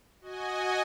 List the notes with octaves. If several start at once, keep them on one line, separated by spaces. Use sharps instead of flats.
F#4 D#5 G#5